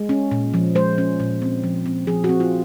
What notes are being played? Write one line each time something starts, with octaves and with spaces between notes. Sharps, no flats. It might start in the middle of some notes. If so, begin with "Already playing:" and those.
Already playing: G#3
C#4
A#2
F3
G#3 C5
C#4
A#2
C4
F3
C4
F3 G#4
F#4
C4
F4